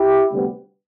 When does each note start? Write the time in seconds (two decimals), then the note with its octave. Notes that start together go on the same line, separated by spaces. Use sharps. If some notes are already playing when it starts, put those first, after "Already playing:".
Already playing: E4 G4
0.30 D2 C3 G3 B3